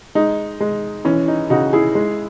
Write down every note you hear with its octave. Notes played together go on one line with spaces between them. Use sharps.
G#3 D#4
G#3
E3 C#4
D#4
C#3 D#4 F#4
E4 G#4
G#3